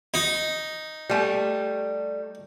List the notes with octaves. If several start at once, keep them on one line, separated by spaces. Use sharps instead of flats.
D#4
G3 A3